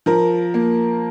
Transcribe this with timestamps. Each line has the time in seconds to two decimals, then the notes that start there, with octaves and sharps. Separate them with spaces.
0.06 F3 A#4
0.54 A#3